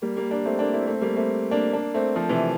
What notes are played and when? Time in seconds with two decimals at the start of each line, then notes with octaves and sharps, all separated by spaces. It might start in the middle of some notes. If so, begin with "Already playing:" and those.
0.02 G3 A#3
0.17 G3 A#3
0.31 A#3 D4
0.45 A3 C4
0.59 A#3 D4
0.73 C4 E4
0.87 A3 C4
1.01 G3 A#3
1.16 A3 C4
1.51 A#3 D4
1.73 A#3 D4
1.94 A3 C4
2.15 F3 A3
2.29 C3 E3